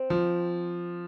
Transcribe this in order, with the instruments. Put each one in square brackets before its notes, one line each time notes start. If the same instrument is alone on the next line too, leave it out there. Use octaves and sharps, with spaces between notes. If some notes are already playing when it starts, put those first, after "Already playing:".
Already playing: [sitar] C4
[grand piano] F3